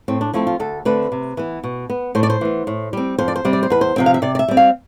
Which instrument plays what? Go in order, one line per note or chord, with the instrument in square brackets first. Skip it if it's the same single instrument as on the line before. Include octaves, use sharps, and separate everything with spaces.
[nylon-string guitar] A2 C4
D4
F3 A3 C4 E4
F4
D2 A4
D3 A3 C4 B4
C3
E3 B3
B2
B3
A2 C5
D5
C5
E3 B3
A2
G3 C4
F2 C5
D5
C5
C3 G3 C4
D5
C5
E2 B4
C5
C3 F3 C4 G5
F5
E5
C3 D5
D5
E5
G3 C4
F5